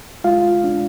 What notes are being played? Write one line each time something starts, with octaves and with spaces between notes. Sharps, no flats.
G#3 F4 F5
D4